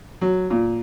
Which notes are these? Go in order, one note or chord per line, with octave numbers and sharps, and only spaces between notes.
F#3
A#2